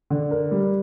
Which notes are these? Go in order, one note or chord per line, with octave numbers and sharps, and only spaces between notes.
D3
A#4
G3